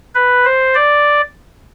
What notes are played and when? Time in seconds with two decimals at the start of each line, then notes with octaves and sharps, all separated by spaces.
0.15 B4
0.45 C5
0.75 D5